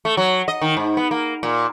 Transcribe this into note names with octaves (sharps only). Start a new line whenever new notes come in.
A3
F#3
D#5
D#3
G#2
B3
A#3
A#2